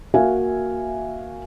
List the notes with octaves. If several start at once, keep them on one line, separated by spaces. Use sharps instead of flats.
A#3 F#4 E5 F5 G#5